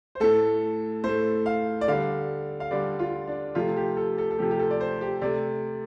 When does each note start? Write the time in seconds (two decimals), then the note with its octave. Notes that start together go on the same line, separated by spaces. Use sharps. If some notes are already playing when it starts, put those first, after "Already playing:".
0.15 C5
0.20 A2 A3 A4
1.04 A2 A3 C5
1.46 F5
1.81 D5
1.88 D3 G3 F5
2.60 F5
2.71 D3 G3 D5
2.99 F4
3.27 D4
3.55 C3 F3 A3 F4
3.76 G4
3.97 A4
4.18 A4
4.30 A4
4.38 C3 F3 A3 G4
4.51 G4
4.59 A4
4.71 D5
4.81 C5
5.01 G4
5.21 C3 A3 D5